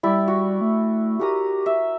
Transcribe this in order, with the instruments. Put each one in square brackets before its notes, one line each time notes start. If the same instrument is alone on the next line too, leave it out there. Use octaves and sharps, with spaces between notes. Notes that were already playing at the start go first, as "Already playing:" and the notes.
[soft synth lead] G3 [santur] E4 G4 D5
[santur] F#4
[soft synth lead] A3
[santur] F#4 A#4 D#6 [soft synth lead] G4
[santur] E5